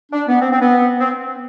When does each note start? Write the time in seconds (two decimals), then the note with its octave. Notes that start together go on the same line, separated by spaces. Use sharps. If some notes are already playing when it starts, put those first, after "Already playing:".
0.12 D4
0.28 B3
0.41 C4
0.52 C4
0.60 B3
0.99 C4